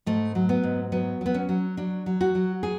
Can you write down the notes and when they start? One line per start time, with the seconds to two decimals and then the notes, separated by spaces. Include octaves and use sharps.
0.06 G#2 A3
0.35 F#3
0.49 B3
0.64 G#2
0.92 F#3 B3
1.21 F#3 B3
1.34 C#4
1.49 F#3
1.77 F#3 D4
2.06 F#3
2.21 F#4
2.35 F#3
2.63 G#4